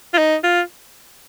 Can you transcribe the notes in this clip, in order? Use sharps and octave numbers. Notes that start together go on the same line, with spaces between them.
F4
D#4
F4